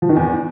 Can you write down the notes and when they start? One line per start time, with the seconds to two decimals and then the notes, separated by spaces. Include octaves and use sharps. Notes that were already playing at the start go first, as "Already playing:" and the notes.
0.02 F3
0.09 D#3
0.16 E2